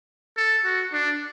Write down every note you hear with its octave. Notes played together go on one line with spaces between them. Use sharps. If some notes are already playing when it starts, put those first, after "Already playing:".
A4
F#4
D4